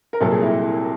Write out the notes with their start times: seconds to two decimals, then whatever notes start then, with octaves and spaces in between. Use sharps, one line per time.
0.13 A#4
0.21 C2 A#2 F#3 A4
0.32 G#4
0.42 E4